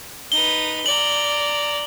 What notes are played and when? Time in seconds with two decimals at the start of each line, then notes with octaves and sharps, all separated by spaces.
0.32 D#4 B4 G7
0.86 D5 A#5 F#7